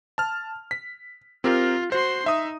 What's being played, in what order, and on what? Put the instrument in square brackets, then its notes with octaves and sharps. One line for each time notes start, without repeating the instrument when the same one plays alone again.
[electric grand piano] A5 F6
B6
[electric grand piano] C4 G4 A#4 [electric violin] F4
[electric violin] F#4 C6 [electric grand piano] C5
[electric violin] D#4 [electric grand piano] E5 D#6